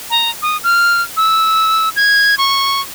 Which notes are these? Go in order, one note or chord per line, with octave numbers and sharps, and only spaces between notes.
A#5
D#6
F6
E6
G#6
C#6